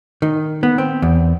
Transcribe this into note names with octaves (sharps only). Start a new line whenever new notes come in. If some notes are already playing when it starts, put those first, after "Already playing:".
D#3
B3
C4
E2